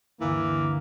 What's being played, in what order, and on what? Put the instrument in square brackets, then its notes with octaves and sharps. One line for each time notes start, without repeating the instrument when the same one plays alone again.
[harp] D2 G2 D3 [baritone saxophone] E3 [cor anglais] A#3